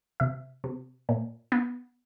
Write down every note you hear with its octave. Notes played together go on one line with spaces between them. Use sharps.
C3 E5
C3
A#2
B3